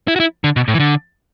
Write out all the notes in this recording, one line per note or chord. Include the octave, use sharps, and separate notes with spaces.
E4
F#4
E4
D3
B2
A2
E3
D3